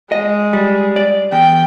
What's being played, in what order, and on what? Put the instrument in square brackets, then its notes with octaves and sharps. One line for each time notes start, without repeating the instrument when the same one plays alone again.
[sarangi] G#3 [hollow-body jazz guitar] D#5
[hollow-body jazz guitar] G3
D5
[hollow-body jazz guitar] E2 [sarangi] G5